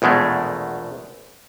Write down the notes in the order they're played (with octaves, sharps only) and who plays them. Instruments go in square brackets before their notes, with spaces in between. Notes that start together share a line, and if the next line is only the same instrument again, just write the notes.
[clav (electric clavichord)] A#1 E2 B2 G#3 A3